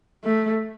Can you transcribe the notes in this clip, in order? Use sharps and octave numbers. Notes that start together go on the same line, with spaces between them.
A3